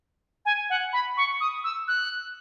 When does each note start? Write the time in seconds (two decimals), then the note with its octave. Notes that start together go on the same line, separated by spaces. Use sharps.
0.46 G#5
0.70 F#5
0.93 B5
1.17 C#6
1.40 D#6
1.64 E6
1.88 F#6